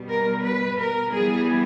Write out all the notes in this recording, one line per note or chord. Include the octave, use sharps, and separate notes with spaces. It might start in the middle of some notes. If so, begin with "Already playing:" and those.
Already playing: B2 G3 B3
A#4
B4
A#4
E3 G3 B3 G#4